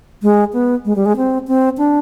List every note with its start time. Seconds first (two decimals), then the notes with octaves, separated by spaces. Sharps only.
0.23 G#3
0.53 B3
0.85 G#3
0.96 G3
1.06 G#3
1.17 C4
1.48 C4
1.78 D4